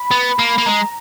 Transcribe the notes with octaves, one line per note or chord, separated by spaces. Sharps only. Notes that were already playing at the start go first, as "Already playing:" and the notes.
Already playing: B5
B3
A#3
A#3
G#3 A#5